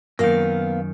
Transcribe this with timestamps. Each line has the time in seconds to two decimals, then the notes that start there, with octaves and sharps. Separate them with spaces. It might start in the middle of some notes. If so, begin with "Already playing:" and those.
0.19 F#2 D#3 A#3 B3 A#4 F5